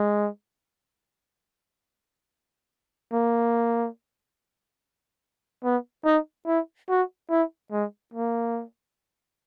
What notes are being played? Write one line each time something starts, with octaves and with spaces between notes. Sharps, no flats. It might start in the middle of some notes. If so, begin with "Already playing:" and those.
Already playing: G#3
A#3
B3
D#4
E4
F#4
E4
G#3
A#3